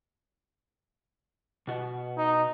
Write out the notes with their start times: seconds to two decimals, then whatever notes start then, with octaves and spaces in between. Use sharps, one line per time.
1.67 B2 F#4
2.17 D#4